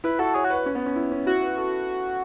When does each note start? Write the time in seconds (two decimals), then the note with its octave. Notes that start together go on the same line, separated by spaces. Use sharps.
0.04 E4 B4
0.19 F#4 A4
0.34 G#4 C#5
0.44 F#4
0.50 B4
0.66 C#4
0.75 B3
0.86 C#4
0.96 E4
1.12 C#4
1.26 E4 F#4
1.42 B4
1.58 A4